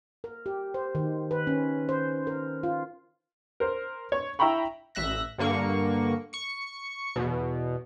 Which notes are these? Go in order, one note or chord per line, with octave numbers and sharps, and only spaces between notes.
A#4
G4
C5
D#3
B4
C#4
C5
A#4
F4
A#4 C5
C#5 C#6
E4 E5 G5 A#5 B5 C#6
A1 E5 F#6 A#6
G2 D3 A#3 C#6
C#6 C#7
E2 B2